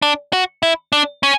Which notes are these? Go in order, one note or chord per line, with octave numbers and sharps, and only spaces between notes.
D4
F#4
E4
D4
C#4